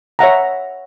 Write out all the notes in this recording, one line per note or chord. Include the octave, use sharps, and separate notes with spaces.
C#5 E5 F#5 A#5